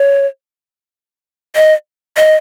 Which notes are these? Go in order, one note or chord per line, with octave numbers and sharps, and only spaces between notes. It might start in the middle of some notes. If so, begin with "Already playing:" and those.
Already playing: C#5
D#5
D#5